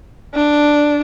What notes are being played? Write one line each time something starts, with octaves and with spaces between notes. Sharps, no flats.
D4